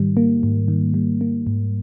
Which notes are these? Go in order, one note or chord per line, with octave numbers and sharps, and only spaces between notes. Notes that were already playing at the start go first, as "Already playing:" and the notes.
Already playing: G#2 D#3 G3
A#3
G#2
D#3
G3
A#3
G#2